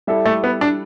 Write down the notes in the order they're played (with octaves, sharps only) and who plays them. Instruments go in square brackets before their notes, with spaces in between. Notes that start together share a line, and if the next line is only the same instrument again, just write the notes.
[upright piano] G3 E4 A4 E5
[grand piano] A3
B3
D4